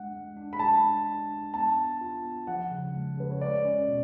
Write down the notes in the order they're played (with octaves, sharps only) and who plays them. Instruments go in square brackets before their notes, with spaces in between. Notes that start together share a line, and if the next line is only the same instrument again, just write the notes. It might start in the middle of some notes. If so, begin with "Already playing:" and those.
Already playing: [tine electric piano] G#3 D4 [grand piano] F#5
[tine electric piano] G#3
D4
[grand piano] B5
[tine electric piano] G#3 [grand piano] A5
[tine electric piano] D4
D4
D4
[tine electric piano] B3 [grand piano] A5
[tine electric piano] B3
F4
B3
[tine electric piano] F3 [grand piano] F#5
[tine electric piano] C#3
G#3
[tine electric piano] C#3 [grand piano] B4
[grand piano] C#5
[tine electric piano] G#3 [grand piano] D5
[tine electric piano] C#4
B2